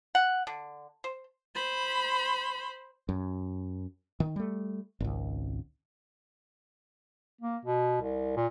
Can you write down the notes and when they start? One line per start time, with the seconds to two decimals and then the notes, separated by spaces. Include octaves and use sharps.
0.15 F#5
0.47 D3
1.04 C5
1.55 C5 B5
3.09 F#2
4.20 D#3
4.36 G3 A3
5.00 G#1 C#2
7.41 A#3
7.65 B2
8.02 C2
8.36 A#2